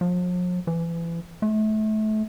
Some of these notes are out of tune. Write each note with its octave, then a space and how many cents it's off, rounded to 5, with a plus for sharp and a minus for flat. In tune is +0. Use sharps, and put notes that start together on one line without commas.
F3 +45
E3 +30
A3 -30